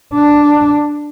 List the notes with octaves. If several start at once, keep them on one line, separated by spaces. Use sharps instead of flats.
D4